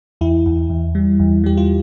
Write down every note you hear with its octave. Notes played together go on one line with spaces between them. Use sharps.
E2 E4
E2
E2
G3
E2
G3 G4
F4